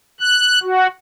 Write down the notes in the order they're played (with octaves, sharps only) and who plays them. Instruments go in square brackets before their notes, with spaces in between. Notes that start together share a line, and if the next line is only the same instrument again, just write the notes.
[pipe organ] F#6
F#4